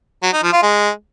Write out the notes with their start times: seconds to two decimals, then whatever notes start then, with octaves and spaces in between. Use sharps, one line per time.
0.23 F#3
0.33 D#4
0.43 F3
0.53 F4
0.63 G#3